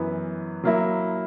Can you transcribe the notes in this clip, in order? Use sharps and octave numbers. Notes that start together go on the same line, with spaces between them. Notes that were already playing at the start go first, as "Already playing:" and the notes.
Already playing: F#2 E3 B3
F#3 A#3 E4